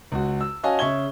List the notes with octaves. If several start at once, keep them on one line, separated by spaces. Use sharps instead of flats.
C#2 F#4
E6
C#4 F#4 D#5 F5 G#5 A5
C#3 E5 C#6 G#6 G7